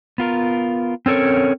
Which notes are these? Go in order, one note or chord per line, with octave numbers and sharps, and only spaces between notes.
B3 F4 A#4
C4 C#4 A4 A#4 C#5